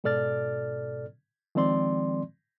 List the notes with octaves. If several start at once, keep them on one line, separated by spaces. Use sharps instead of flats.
G#2 B2 A4 D5 F6 A6
D#3 F3 G#3 C4 D5 C6